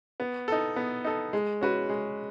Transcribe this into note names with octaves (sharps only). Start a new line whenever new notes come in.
B3
D#4 A4
B3
D#4 A4
G#3
C#4 F#4 B4
G#3